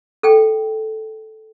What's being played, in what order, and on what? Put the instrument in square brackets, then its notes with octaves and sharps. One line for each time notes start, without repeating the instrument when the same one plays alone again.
[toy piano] A4 G5